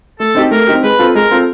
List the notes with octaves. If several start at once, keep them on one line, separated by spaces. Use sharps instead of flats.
A3 A4
C4 D#4 G4
A3 A#4
C4 D#4 G4
G#3 B4
C4 F4 A4
G#3 A#4
C4 F4 A4